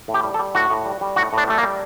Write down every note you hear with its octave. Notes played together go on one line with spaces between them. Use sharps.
A2
G4
G3
A4
G3
A2 F#4
A2
G3
G3
A2 F#4
A2 D4
G3 A3
A#3
G3